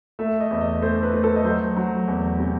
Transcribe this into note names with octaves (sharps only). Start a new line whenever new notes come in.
A3 E5
D#5
E2
D#5
A3 C5
B4
A3
A4
D#5
F#3 C5
F#3
E2
C3